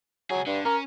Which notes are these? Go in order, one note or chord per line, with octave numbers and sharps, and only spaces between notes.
C#2 F#3 G#4
G2 D3
C#4 A#4